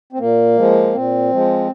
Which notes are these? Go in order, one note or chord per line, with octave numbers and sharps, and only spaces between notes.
C4
A#2 A#3
F3 G#3
A#2 C4
F3 G#3